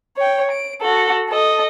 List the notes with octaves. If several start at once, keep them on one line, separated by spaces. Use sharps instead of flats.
C#5 G5
D7
F#4 A4
A4 D#5